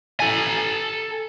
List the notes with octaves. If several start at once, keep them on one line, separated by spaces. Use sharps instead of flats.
A4 G#5